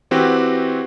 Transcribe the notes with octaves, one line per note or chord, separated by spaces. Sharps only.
E3 C4 F#4 G4 B4